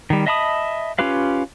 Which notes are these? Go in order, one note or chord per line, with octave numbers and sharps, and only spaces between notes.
D#3 G3
D#5 E5 A5 B5 D#6
C#4 F4 G4 B4 F5